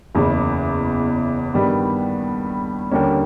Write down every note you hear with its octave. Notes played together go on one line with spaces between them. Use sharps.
F#1 E2 C#3
G2 D#3 G3 B3
D#2 D3 G3 A#3 C#4